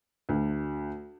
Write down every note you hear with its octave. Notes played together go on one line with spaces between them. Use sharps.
D2